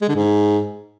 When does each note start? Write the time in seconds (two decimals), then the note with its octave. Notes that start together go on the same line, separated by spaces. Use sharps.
0.02 G#3
0.09 D3
0.16 G#2